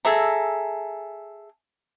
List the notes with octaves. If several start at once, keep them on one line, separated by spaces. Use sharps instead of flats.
G#4 A4 E5 A#5